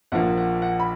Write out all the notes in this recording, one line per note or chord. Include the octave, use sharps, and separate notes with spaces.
A#1 A#2 F3 A#3 F#5
F#5
F#5
B5